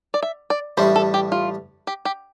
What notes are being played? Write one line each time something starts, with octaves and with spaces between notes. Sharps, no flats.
D5
E5
D5
A1 A2 G3 D4 C5
A4
G4
F4
G4
G4